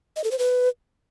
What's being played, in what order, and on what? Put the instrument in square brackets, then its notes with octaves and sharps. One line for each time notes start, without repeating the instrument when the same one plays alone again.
[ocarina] D#5
A4
C5
B4